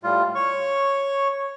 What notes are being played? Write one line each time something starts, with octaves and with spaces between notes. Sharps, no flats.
A2 G3 F4
C#5 C#6